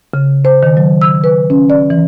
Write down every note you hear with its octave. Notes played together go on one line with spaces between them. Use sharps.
C#3
C5
D#3
F#3
E6
B4
C#4
D5
E3